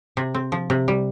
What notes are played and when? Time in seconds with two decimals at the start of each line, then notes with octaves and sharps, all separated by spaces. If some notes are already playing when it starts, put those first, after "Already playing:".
0.17 C3
0.34 C4
0.52 F3
0.70 C3
0.88 G3